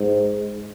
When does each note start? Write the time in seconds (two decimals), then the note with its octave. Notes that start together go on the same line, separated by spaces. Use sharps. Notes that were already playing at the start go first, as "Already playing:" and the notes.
Already playing: G#2